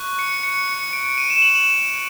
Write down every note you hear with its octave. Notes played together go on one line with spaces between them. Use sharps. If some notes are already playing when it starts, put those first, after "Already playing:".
Already playing: C#6 F#6
C#7
C#7
C#7
D7
D#7
E7
F#7
E7